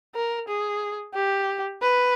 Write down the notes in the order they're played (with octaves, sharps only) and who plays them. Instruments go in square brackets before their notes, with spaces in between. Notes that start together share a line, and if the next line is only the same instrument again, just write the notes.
[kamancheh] A#4
G#4
G4
B4